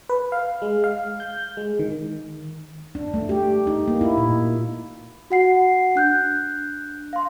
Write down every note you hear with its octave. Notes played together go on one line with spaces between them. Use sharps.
B4
F5
G#3
F5
G6
G#3
D#3
D4
A3
G4
D#4
A#3
E4
A#2
F#4 F#5 C7
D4 F#6 G6
F5 C6